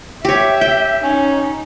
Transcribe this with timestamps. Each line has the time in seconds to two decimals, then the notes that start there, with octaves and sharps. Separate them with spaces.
0.25 G4 C#5 E5
0.61 G5
1.03 C#4 D#4